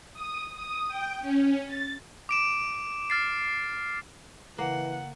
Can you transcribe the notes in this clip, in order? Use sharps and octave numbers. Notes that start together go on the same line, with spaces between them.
D#6
D#6
G5
C#4
A6
D6 D7 E7
F6 A6 C7
C#3 E3 A#3 F#5